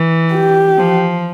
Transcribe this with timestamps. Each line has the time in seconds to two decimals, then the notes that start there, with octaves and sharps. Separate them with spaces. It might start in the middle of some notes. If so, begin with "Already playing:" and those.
Already playing: E3
0.34 G4
0.77 F3